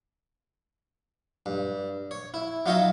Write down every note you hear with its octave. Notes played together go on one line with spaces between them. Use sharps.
G2
C#5
E4
F#3 D#4 F4 C#5 D#5 E5